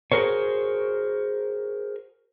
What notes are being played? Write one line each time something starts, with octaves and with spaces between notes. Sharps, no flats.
F#4 G#4 A#4 C5 C#5